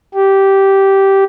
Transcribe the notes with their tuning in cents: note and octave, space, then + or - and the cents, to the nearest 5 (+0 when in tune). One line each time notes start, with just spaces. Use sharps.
G4 -10